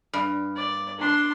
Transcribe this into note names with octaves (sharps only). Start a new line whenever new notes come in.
G2
D5
D4 C6